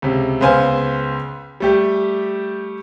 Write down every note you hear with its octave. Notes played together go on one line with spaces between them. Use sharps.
C#2 C3
C#2 B3 C5 F5 G#5
G3 A3 G4